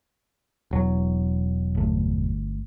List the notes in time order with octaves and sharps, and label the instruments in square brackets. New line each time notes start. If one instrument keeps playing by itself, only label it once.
[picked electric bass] E1 F#3
[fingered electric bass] G1 A3